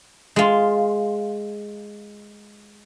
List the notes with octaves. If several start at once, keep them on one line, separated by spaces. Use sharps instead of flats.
G#3 F4